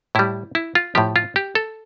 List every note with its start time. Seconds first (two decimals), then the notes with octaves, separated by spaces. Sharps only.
0.15 A2 G3 E4
0.55 E4
0.75 F4
0.95 A2 F3 G4
1.16 F4
1.36 G4
1.55 A4